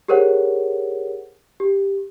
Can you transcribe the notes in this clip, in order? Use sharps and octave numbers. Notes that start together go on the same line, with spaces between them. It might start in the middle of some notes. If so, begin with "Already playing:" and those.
G4 G#4 A#4 C5 C#5 F#5
G4